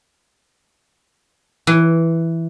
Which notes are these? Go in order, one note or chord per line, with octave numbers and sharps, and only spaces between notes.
E3